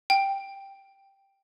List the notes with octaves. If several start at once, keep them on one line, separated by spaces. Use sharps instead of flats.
G5